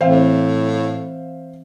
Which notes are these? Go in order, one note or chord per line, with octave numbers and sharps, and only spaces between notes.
A2 E3 C4 C5 E5 F5